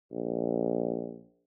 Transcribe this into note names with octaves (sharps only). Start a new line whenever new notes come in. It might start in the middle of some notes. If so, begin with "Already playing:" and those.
A#1